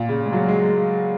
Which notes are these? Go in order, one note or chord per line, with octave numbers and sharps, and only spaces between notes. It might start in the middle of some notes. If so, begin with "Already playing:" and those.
Already playing: A#2
C#3
G#3
F#3
G#3